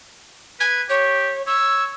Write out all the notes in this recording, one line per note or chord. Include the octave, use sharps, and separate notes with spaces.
B4 G#6
G4 C#5
C#5 E6